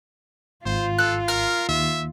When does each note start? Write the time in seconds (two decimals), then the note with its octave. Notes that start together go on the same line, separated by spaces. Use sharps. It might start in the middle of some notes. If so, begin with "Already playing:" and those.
0.66 G#1 F4 C5
0.99 A4 F#6
1.28 A#4 F6
1.69 D#2 E5